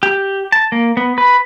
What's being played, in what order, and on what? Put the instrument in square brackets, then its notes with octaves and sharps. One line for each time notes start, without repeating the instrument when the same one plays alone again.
[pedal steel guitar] G4
A5
A#3
B3
B4